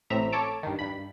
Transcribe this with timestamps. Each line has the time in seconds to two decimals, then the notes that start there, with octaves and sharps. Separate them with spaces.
0.10 A1 A2 C4 E5 A#5
0.32 A4 C#5 A5 D6
0.63 G2 D#3
0.79 G2 B5